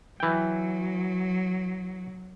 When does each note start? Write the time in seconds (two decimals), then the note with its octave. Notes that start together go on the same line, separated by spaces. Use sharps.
0.20 E3 F#3 G5